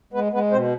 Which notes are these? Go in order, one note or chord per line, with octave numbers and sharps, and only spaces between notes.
G#3 B3 B4
G#3 B3 B4
B2 C4 C5